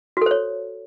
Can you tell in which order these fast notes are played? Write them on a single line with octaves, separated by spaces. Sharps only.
F#4 A4 C5 C#5